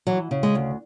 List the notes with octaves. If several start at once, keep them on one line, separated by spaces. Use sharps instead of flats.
E3 F#3
C#3
G#3
D2